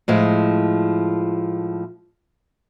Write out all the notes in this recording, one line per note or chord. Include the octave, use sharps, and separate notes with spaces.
A2 F3 G#3